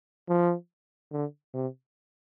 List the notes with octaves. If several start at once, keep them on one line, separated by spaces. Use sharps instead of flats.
F3
D3
C3